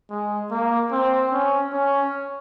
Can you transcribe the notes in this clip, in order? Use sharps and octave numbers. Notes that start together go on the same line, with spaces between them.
G#3
A#3
C4
C#4
C#4